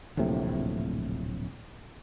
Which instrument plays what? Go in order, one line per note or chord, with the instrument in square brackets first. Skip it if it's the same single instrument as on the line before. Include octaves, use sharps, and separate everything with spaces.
[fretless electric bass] D1 A#1 A2 C3